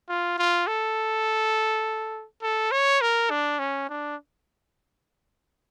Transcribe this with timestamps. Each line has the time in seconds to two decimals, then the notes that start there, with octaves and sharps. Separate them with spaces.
0.09 F4
0.39 F4
0.67 A4
2.43 A4
2.72 C#5
3.01 A#4
3.31 D4
3.59 C#4
3.89 D4